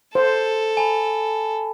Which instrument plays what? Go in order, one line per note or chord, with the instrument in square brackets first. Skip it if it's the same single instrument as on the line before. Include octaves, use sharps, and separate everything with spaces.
[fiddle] A4 [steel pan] C5
[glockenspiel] G#5 A5 B5